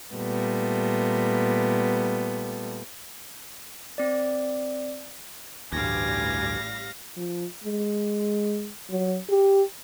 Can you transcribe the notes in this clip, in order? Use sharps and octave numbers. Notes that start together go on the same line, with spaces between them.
A#2 G3 A3 B3
C4 D5
A1 D2 G2 G3 F5 G#5 A#6
F3
G#3
F#3
G4